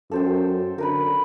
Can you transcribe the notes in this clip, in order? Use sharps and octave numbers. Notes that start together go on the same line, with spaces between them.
F#2 A4 C5 G5
D3 A#4 B4 B5